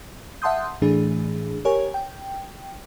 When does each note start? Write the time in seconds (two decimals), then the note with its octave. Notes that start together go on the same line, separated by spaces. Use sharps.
0.42 E5 F#5 A5 C6 D#6 G6
0.82 A2 E3 A3 D4 G#4
1.65 G4 A#4 C#5 G#5
1.94 G5